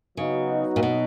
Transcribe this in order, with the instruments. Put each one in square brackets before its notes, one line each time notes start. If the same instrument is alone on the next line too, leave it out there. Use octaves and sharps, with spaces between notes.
[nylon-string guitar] C#3 [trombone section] F#3 B3 D#4 F#4
[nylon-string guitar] A#2
B2